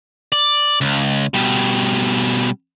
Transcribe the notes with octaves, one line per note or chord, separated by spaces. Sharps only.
D5
C#2
B2 G3